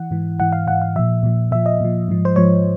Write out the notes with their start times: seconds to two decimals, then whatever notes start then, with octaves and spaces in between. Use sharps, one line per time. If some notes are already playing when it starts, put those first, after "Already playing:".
Already playing: E3 F#5
0.11 G#2 E3
0.39 G#2 E3 F#5
0.52 F5
0.67 G#2 E3 F#5
0.82 F5
0.96 A#2 F3 E5
1.23 A#2 F3
1.51 A#2 F3 E5
1.66 D#5
1.81 A#2 F3
2.08 G#2 F3
2.25 C5
2.36 G#2 F3 C#5